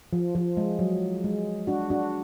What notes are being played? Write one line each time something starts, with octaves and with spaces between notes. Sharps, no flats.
F3
F3
G#3
F#3
G#3
D4 F#4
D4 F#4